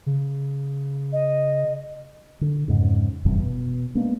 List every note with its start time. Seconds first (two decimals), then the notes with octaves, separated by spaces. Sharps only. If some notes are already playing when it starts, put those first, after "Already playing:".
0.06 C#3
1.13 D#5
2.41 D3
2.68 F2 G#2 C#3
3.25 F1 E2 G2 C3
3.39 B2
3.95 G#3 A#3 B3 D4